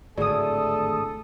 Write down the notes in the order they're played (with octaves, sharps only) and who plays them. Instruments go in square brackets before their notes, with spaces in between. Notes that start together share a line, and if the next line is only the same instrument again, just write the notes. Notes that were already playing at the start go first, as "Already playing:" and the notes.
[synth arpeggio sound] G#1 D#6 [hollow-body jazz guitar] D2 A2 [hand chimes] G#4 D5 [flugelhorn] A4